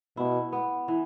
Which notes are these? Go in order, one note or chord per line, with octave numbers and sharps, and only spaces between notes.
B2 E4
B3
E3